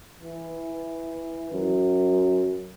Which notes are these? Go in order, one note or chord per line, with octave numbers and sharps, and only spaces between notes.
E3
F#2